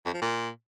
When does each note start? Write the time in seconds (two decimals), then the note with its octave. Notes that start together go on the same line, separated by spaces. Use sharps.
0.05 F2
0.14 F3
0.22 A#2